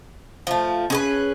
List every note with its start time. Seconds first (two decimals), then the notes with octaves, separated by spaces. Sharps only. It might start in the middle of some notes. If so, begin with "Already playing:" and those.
0.47 F3 A3
0.90 C#4 G#4 B4